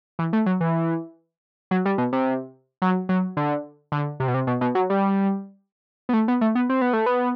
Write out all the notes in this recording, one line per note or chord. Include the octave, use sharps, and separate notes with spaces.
E3
A3
F#3
E3
F#3
G3
B2
C3
F#3
F#3
D3
D3
C3
B2
C3
B2
B2
F#3
G3
B3
A3
B3
A3
B3
C4
B3
A3
B3